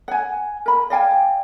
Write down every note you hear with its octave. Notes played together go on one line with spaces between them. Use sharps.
F#5 G#5
A#4 B5
D5 F5 G5 G#5